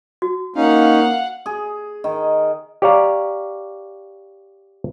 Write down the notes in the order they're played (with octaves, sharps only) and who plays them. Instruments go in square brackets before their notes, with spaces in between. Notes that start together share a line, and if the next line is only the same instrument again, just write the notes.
[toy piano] F#4
[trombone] A#3 [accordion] C#4 D#4 [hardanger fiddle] F5 F#5
[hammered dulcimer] G#4
D#3
[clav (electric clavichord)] G4 C#5 D5 F5 A#5